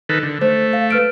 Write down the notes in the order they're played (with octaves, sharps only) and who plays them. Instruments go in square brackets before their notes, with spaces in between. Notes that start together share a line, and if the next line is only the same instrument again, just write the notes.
[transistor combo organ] D#3 A4 B4
D3
[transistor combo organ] A3 [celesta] C5
[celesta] F5
B4 F6 D7